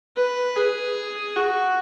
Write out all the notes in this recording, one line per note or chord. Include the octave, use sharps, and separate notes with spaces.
B4
G#4
F#4